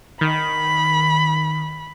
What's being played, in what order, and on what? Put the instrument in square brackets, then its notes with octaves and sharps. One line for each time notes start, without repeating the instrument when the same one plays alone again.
[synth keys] D#3 [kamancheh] B5